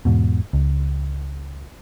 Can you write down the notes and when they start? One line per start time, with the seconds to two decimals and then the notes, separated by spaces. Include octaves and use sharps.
0.05 E2 G#2 B2
0.53 C#2